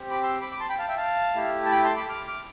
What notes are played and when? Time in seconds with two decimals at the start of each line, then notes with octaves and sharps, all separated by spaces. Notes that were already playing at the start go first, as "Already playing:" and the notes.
Already playing: C4 G4
0.10 B5 D6
0.23 C6 E6
0.41 B5 D6
0.52 D6
0.60 A5 C6
0.69 G5 B5
0.79 F5 A5
0.88 E5 G5
0.97 F5 A5
1.35 A3 E4 G4
1.65 A5
1.71 G5 B5
1.84 A5 C6
1.96 B5 D6
2.09 D6 F6
2.28 D6 F6